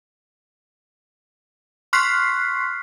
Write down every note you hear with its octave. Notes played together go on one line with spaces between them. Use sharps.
C6 C#6 F6 F#6 B6 C7